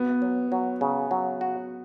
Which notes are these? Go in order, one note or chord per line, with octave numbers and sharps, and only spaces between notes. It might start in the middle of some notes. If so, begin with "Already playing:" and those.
Already playing: B3 F#4
F#3
F#3
C#3
F#3
F#4